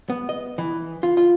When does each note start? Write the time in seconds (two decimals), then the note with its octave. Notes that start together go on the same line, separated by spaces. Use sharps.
0.10 B3
0.29 D#5
0.58 E3
1.03 F4
1.17 F4